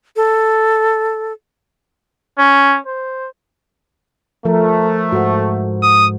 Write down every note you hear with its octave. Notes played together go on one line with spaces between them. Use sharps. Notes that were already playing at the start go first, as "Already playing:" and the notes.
A4
C#4
C5
F3 A3 A#4
G#2 F#4 A4 C5
D#6